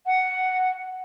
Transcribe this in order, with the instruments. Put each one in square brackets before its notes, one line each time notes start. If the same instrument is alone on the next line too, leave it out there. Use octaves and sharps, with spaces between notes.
[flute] F#5